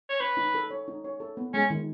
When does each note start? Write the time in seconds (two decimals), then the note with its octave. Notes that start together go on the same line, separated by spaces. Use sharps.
0.10 C#5
0.20 B4 C#5
0.37 D#4
0.54 A4
0.71 C#5
0.88 D#4
1.04 C#5
1.20 A4
1.37 B3
1.54 G#3 C#4
1.70 D#3